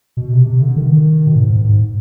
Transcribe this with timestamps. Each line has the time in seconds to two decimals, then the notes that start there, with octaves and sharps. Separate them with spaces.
0.17 B2
0.32 C3
0.46 C3
0.62 D3
0.76 D#3
0.91 D#3
1.27 B2
1.35 G#2
1.49 G#2
1.64 G#2